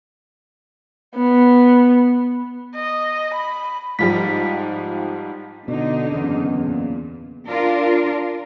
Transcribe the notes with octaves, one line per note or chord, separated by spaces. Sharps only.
B3
D#5
B5
G#2 F3 G3 B6
B2 D3 D#4
F#1 E2 C#3
A#2
D4 F4 A#4